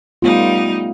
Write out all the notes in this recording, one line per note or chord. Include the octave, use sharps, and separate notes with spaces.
G3 A3 B3 D#4 F4